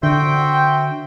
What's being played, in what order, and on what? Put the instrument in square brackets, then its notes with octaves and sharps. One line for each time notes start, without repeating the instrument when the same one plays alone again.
[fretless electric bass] D3 [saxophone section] F#4 C5 E5 [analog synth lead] G5